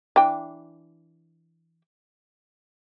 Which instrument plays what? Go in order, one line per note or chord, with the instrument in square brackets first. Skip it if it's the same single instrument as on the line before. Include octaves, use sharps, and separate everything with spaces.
[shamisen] E3 D4 G5